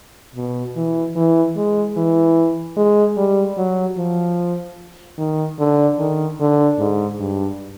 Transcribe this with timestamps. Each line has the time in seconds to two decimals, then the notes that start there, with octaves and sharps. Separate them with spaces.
0.36 B2
0.76 E3
1.16 E3
1.57 G#3
1.97 E3
2.77 G#3
3.17 G3
3.58 F#3
3.98 F3
5.18 D#3
5.59 D3
5.99 D#3
6.40 D3
6.79 G#2
7.20 G2